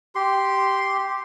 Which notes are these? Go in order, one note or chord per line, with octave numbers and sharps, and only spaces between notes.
G4 C6